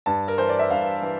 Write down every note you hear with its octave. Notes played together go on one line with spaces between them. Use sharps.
G2 A5
A#4
E3 C5
D5
E5
G2 F5
E3